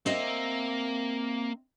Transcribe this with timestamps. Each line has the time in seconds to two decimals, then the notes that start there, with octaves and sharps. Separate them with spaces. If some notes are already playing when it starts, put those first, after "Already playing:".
0.06 A#3 C4 D#5 E5